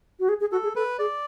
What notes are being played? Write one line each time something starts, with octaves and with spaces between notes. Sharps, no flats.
F#4
G#4
G#4
F#4 A4
G#4
A4 B4
G#4 D5